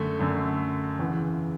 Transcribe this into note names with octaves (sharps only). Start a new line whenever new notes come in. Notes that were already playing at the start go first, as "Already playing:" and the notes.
Already playing: F#2 D3 A3
F#2 D3 A3
E2 C#3 E3